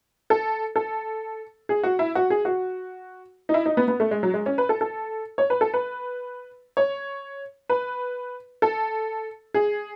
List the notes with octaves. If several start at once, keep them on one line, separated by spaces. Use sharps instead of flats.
A4
A4
G#4
F#4
E4
F#4
G#4
F#4
D#4
E4
D#4
B3
B3
A3
G#3
F#3
G#3
C#4
B4
A4
A4
C#5
B4
A4
B4
C#5
B4
A4
G#4